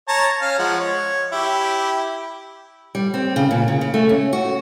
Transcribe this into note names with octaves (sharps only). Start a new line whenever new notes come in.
C#5 A5 A#5
C#4 F5
F3 G#3 F#5
C#5
E4 G4
G3
C4
C#3
A#2
C#3
C#3
A3
C#4
F#4